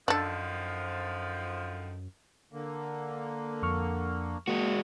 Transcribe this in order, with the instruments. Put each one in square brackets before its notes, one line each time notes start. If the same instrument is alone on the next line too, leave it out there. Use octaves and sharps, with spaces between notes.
[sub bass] F#2 [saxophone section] D3 D#3 F3 [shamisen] D4 A4
[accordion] D3 A#3
[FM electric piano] F2 C#6 F6
[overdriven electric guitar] G#3 F#4 [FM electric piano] A#3